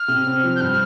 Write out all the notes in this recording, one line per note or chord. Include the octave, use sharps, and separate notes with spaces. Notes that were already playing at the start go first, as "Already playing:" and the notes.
Already playing: F6
C3
C4
F3
G6
G2 F6